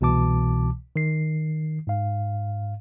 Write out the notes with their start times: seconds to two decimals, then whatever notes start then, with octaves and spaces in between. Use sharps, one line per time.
0.01 C2 B2 E3 A5 D6
0.96 D#3 C7
1.87 G#2 F5